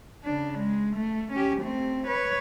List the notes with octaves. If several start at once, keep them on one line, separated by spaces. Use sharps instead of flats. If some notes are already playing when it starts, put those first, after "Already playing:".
C#3 D4
G#3
A3
C#4 G4
A3 C4
B4 C#5